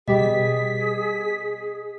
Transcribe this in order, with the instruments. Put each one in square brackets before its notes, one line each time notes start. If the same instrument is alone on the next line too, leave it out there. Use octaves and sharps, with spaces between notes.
[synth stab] B2 G3 G4 [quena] G#4 [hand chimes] D#5 [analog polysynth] B6